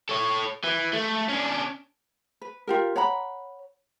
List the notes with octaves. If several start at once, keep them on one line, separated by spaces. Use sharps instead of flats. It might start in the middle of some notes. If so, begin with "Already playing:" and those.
A4 C#5
E3
A3
C#4 D4
B4
F4 G4 A#4
C#5 F#5 A#5 B5